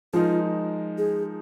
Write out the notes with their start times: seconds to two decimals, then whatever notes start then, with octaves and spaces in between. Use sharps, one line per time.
0.13 F3 G#3 D#4 F4 A#4
0.98 G#4